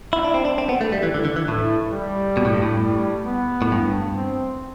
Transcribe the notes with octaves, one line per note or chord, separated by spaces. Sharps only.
E4
D4
C4
D4
C4
B3
A3
G3
E3
D3
D3
E3
A2 A3
G3
B2
A2
G2
A2
G3
B3
A2
G2
C4